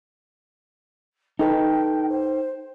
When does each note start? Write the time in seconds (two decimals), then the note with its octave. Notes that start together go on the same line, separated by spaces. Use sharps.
1.39 D#4 A4 B4 G5
2.09 C5